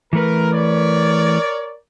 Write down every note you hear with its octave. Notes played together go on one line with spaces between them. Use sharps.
E3 A3 A#4 B4
A#4 C#5 D5